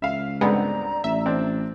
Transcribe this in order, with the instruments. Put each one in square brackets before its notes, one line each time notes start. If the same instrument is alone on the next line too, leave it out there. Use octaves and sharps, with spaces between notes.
[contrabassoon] C#2 [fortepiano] E5 F5
[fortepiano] G2 D3 C4 [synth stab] G#3 B3 [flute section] D5 A#5
[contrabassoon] A1 [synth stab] E5
[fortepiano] C4 D4